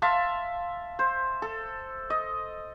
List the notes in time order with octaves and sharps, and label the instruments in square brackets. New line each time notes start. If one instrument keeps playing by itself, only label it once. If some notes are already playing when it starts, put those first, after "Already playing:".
[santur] E5 F5 A5 C6
C5
A4
D#5